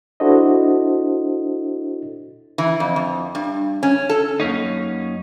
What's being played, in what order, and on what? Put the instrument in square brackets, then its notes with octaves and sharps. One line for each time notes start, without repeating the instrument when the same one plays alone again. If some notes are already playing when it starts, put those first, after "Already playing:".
[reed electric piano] D4 E4 F#4 A4 C5 D#5
[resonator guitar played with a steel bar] E3
F2
F2
G2
C#4
A4
[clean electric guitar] F#2 A#3 C#4 D#4